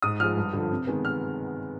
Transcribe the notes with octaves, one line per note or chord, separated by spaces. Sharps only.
G#2 D#6
F3 G#3 F6
G2
D3 F3
C3
D#3 G#3 B3
F6